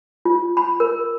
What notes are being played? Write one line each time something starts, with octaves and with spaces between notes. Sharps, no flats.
F4
B5
A#4